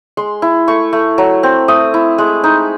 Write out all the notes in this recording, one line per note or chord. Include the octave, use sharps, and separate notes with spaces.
G#3 C6
E4
A3 C#6
A3
F#3
C4
A3 D#6
E4
G#3
D#4